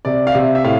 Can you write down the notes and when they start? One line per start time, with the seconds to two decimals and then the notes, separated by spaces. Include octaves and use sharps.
0.05 C3 D5
0.27 F5
0.35 C3 E5
0.55 E5
0.64 A2 F5